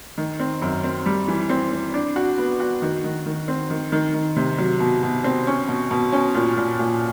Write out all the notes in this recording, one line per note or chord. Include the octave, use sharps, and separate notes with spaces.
D#3
C4
F#2
C4
G3
E3
C4
C4
D4
F#4
B3
F#4
D#3
D#3
D#3
C4
D#3
D#3
D#3
C3
F#3
B2
B2
C4
C#4
B2
B2
C#4
A#2
A#2
A#2